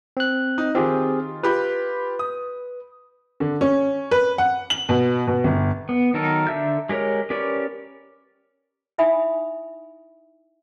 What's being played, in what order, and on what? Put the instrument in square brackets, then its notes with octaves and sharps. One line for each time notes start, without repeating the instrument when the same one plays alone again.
[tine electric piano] C4 F#6
[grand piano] D#4
[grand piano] D#3 F4 [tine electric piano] C4 G4 G#4
[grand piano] F4 G4 B5 [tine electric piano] B4
[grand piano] D#6
[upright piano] D3
C#4
B4
F#5
F#7
B2
B2
G1
[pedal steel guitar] B3
D#3 F#3 D#4 A4 A#4
D3 E5 G6
G#3 G4 A#4 C#5
C#4 G4 A#4 B4 D5
[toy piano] D#4 E4 E5 G#5 B5 D#6